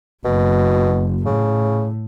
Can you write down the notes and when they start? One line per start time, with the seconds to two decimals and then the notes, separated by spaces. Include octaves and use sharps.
0.25 F#1 B2
1.26 A2 C#3